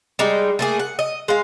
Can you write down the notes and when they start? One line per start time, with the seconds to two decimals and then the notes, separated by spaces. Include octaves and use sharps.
0.19 G3 G#3 D#4
0.59 A3 A#3 G#4
0.79 F#5
0.99 D#5
1.28 G#3 F5